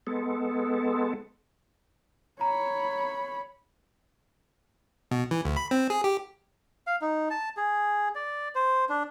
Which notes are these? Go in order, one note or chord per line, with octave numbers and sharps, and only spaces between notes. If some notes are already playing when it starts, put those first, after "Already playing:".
G#3 B3 A4
C#5 A#5 B5
B2
E3
D2
B5
C4
G#4
G4
F5
D#4
A5
G#4
D5
C5
D4